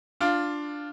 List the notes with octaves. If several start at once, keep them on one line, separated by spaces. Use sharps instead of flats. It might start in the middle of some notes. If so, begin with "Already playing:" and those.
D4 F4